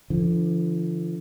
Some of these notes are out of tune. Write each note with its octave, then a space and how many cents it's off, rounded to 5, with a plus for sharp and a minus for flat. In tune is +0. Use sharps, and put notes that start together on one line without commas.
D3 +0 F3 -35